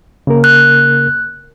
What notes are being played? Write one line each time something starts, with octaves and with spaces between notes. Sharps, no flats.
C#3 A#3 A#4
F#6